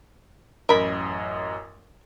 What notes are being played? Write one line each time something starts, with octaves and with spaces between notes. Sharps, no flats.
A1 F#2 A#4 D#5 B5